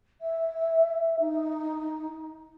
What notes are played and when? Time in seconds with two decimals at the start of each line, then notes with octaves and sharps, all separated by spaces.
0.21 E5
1.20 D#4